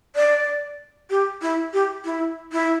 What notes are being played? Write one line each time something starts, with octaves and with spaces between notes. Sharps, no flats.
D5
G4
E4
G4
E4
E4